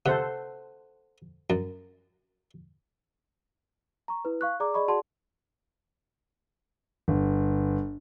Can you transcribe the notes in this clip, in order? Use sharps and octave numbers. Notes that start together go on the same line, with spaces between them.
C3 A4 C5 F#5
F#2
A#5 C#6
E4 B4
F5 C#6 F#6
G#4 D5 A#5 D6
G#4 D5 D#5 B5 C#6
F#4 G#4 D5 F#5 A5 C6
G1